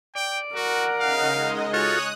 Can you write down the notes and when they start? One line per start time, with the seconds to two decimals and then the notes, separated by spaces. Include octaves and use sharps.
0.15 D5 G5
0.55 F#4 A#4 F#5
1.00 C#3 D#4 F5
1.30 G#3 D#5
1.73 F4 F#4 A4 C#5 D#6 F#6